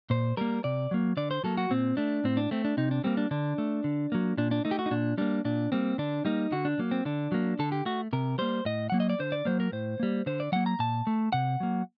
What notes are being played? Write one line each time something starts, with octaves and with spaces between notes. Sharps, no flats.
A#2 C5
G3 A#3 A#4
C3 D5
F#3 A#3
D3 D5
C5
F#3 A#3 A4
F#4
A#2 C4
A3 D4
A2 C4
D4
A3 C4
D4
C3 D#4
D4
G3 A#3 C4
D4
D3 D4
A3
D3
F#3 A#3
A#2 D4
D4
A3 D#4
G4
F#4
D#4
A#2 D4
G3 A#3 D4
A#2 D4
G3 A#3 C4
D3 D4
G3 A#3 D#4
D3 F#4
D4
F#3 A#3
C4
D3 D4
F#3 A#3
D3 A4
G4
A3 F#4
C3 A#4
G3 A#3 C5
A2 D#5
F#3 A#3 F#5
D#5
D5
D3 C5
D5
F#3 A#3 C5
A#4
A2 C5
G3 A#3
D3 C5
D5
F#3 A#3 F#5
A#5
A#2 A5
A3
C3 F#5
F#3 A#3